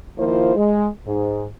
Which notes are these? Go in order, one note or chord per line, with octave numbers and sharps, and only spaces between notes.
D#3 F3 A#3 E4 F4 C5
G#3
G#2